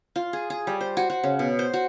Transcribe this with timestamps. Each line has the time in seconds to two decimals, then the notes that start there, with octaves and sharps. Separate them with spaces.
0.16 F4
0.33 G#4
0.50 G#4
0.67 G3
0.81 C5
0.97 F#4
1.10 F#4
1.23 C#3
1.39 B2
1.59 C5
1.73 F#4